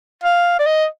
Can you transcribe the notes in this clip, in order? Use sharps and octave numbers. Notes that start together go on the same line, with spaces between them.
F5
D5
D#5